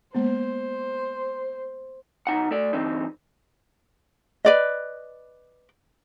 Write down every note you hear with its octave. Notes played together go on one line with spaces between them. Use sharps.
G#3 A#3 B3 C5
B1 D#4 F#5
A3 A4 D5
G2 D3 E3 C4 D#4
B4 D5 D#5